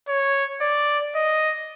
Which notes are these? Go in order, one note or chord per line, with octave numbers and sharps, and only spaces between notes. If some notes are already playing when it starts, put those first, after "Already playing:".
C#5
D5
D#5